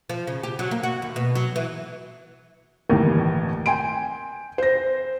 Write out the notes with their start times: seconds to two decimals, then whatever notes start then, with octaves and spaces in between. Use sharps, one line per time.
0.10 F3
0.27 C#3
0.43 G4
0.59 F#3
0.71 A#3
0.83 F#4
1.02 D#2
1.16 B2
1.35 F#3
1.56 E3
2.89 G1 D#2 A2 E3 A#4
3.66 G5 G#5 C6 D7
4.58 C5 A#6